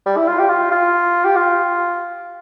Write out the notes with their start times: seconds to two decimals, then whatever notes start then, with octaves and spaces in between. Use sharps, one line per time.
0.06 G3
0.17 E4
0.28 F4
0.39 G4
0.49 F4
0.72 F4
1.25 G4
1.36 F4